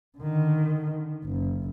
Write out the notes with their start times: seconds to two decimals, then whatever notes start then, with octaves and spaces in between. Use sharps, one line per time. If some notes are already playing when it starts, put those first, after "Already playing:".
0.18 D3 D#3
1.24 F#1